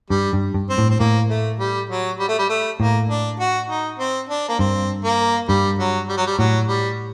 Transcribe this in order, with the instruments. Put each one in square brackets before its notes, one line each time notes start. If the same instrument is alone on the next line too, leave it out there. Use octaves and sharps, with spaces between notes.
[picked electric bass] G2 [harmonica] G3
[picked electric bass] G2
G2
[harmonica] C4
[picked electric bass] A2
[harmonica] C4
[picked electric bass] A2 [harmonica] A#3
[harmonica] A3
G3
F#3
G3
A3
G3
A3
[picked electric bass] A2 [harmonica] A#3
[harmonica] D4
F#4
D#4
C4
D4
A#3
[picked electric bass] G2 [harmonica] C4
[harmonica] A#3
[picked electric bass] G2 [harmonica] G3
[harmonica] F#3
G3
F#3
G3
[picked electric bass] A2 [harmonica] F#3
[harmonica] G3